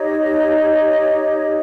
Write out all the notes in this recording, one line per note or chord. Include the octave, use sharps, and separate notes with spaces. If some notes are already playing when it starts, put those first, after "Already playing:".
Already playing: D#4 G4 C#5 D#5